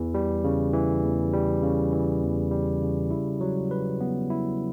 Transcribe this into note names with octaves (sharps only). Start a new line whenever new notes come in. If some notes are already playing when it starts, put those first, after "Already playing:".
Already playing: E2 E3
G3
C#3
E3
E2
G3
C#3
E3
E2
G3
C#3
E4
F#3
B4
B3
E4